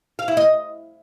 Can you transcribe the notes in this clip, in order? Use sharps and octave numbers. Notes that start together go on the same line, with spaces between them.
F5
E4
D#5